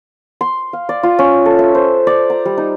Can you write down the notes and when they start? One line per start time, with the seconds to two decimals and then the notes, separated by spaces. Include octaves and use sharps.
0.41 C6
0.73 F5
0.89 D5
1.03 F4
1.19 C#4
1.45 A4
1.59 E5
1.75 C5
2.07 D5
2.30 A#5
2.45 G3
2.58 D#4